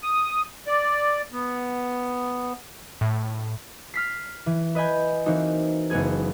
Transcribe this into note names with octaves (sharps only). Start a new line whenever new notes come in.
D#6
D5
B3
A2
F6 B6 C7
E3
B4 D#5 G#5 B5 G6
E3 A#3 C4 D#4 F#4
F#1 G#3 B3 G#4 G#6